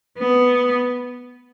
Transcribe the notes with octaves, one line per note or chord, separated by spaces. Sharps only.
B3